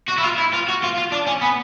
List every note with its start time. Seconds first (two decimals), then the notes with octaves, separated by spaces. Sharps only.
0.09 F#4
0.19 E4
0.24 F4
0.38 E4
0.53 F4
0.68 F#4
0.83 F4
0.97 F4
1.12 D4
1.27 C#4
1.41 B3